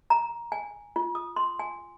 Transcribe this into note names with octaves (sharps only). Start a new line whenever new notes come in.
A#5
G#5
F4
D#6
C6
G#5